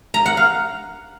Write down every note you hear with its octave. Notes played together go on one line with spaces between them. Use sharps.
A#5
F#5
F5